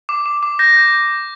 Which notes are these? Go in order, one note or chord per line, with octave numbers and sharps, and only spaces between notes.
D6
D6
D6
G6 A#6
G6